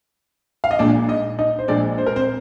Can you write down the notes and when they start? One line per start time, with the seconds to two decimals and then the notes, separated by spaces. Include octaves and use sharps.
0.64 F5
0.71 D#5
0.79 A#1 A#2 G#3 D4 D5
1.08 D#4 D#5
1.39 D#4 D#5
1.59 C5
1.68 A#1 A#2 G#3 D4 D5
1.98 C5
2.06 A#4
2.16 C4 C5